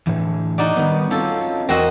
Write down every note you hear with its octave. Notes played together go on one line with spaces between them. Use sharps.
A2 D3 E3
D#4 F#4 D5
D#3 G3 B3
C4 C#4 F4 A4
E2 C4 F#4 A#4 D#5